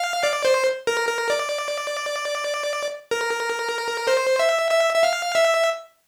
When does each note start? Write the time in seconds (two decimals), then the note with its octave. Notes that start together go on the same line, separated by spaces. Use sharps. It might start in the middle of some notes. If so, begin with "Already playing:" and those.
Already playing: F5
0.23 D5
0.45 C5
0.87 A#4
1.09 A#4
1.30 D5
3.11 A#4
4.07 C5
4.39 E5
4.71 E5
4.95 E5
5.03 F5
5.35 E5